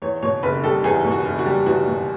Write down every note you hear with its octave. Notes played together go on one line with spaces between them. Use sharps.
E2 C#5
B2 C#5
F#1 B4
G3 A4
E2 G#4
B2
F#4
F#1
F#4
G3
E2 F#4
B2